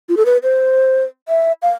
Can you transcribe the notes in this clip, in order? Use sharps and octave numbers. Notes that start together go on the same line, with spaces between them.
F4
A4
B4
C5
E5
F5